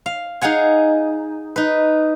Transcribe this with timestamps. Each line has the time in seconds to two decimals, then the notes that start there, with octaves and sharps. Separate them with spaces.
0.06 F5
0.41 D#4 G#4 F5 F#5 G#5
1.56 D#4 B4